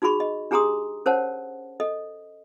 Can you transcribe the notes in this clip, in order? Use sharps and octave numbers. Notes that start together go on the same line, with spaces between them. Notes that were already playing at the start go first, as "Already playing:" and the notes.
D#4 F#4 G#4 B5 C#6
D#5
D4 G4 G#4 A#5 C6 D#6
C#4 A#4 C5 C#5 F#5 A5
A4 D#5